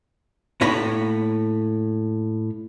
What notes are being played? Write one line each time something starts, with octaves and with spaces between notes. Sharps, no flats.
A2 A#3 C#5 A#5 B5